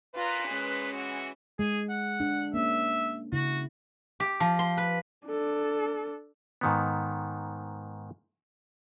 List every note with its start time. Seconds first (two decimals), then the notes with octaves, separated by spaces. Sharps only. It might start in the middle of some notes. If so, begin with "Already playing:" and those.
0.15 A#2 F4 B4 A#5
0.48 G#3 C#4
0.93 E3 F#4
1.59 G#3 G#4
1.90 F#5
2.20 D4
2.54 A#3 C#4 E5
3.33 C#3 E4 F#4
4.20 G4
4.40 F3
4.59 C6
4.77 B4
5.27 D4 A4
6.61 G#2 D#3 B3